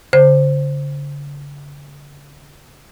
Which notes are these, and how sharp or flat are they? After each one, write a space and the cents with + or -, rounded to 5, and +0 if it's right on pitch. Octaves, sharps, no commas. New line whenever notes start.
D3 -45 C5 +0